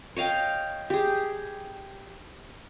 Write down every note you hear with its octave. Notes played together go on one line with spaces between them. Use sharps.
C#5 D#5 F5 G5
G4 G#4